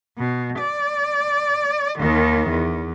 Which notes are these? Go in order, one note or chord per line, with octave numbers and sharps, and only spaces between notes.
B2
D5
D#2 D#3
E2